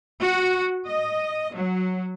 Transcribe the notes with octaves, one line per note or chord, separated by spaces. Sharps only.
F#4
D#5
F#3